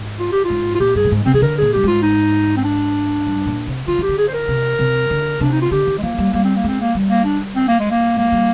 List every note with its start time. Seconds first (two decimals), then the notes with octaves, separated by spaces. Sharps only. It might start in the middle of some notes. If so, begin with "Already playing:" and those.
Already playing: G#2
0.19 F4
0.32 G4
0.44 F4
0.50 G#2
0.75 F4
0.80 A#2 G4
0.95 G2 G#4
1.04 A#2
1.11 G#2
1.26 C3 C4
1.34 D#3 G#4
1.41 D3 A#4
1.58 A#2 G#4
1.73 G2 G4
1.83 G#2 F4
2.03 D#4
2.57 C4
2.64 D4
3.27 G2
3.46 A#2
3.67 C3
3.87 D3 F4
3.98 D#3 G4
4.09 D3
4.18 G#4
4.28 C5
4.34 A#4
4.48 C3
4.79 C3
5.10 D3
5.40 C3 D4
5.52 D#4
5.61 F4
5.71 D3 G4
5.87 D#3
5.98 G#3
6.03 F3 A#3
6.18 G3
6.33 G3 A#3
6.44 C4
6.56 A#3
6.64 G#3 C4
6.81 A#3
6.95 G3
7.10 A#3
7.25 D4
7.56 C4
7.68 A#3
7.80 G#3
7.91 A#3
8.17 G#3 A#3
8.32 G3